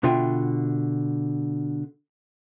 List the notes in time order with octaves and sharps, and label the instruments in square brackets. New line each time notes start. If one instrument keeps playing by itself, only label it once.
[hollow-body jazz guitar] B2 D3 F4 E5 G5